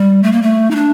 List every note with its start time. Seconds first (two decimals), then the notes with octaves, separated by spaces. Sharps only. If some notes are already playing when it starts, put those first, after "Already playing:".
Already playing: G3
0.23 A3
0.32 A#3
0.42 A3
0.71 D#4
0.75 D4